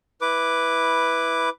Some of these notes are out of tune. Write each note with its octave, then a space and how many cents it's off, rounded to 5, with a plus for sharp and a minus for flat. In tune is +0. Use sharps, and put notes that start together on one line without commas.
E4 -5 B4 +0 D6 +0